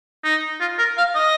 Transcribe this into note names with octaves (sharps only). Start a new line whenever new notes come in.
D#4
F4
A#4
F5
D#5